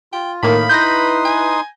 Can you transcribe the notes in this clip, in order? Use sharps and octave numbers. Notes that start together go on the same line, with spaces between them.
F4 G5
A2 D#3 A#3 D#4 F5 B5
D#4 E4 B4 C6 D#6 G6 A#6
G#5